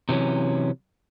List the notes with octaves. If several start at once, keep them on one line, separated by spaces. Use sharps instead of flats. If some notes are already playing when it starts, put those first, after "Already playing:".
C3 E3 F#3 C#4